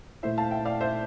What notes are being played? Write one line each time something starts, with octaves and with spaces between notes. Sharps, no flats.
A#2 A3 E4 C5 E5
F5 A5
E5 G5
D5 F5
C5 E5